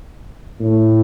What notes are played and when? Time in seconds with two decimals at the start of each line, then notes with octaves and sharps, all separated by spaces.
0.60 A2